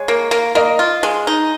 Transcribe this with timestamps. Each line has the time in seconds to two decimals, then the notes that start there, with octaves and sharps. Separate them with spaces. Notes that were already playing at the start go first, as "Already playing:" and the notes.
Already playing: G#3 C#5
0.08 A#3
0.31 A#3
0.55 A#3 D#5
0.79 F4
1.03 G#3
1.27 D#4